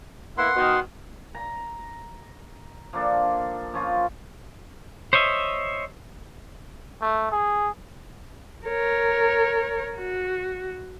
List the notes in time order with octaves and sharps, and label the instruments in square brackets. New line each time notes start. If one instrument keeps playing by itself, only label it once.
[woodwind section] A#3 B3 E4 [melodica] F#5 C6
[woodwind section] B2 D#3
[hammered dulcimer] A#5
F3 A#3 D4 A4
F3 C#4 F4
[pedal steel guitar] C5 C#5 D#5 E5
[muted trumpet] A3
G#4
[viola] A#4 C#5
F#4